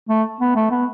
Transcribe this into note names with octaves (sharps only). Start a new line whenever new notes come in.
A3
B3
A3
B3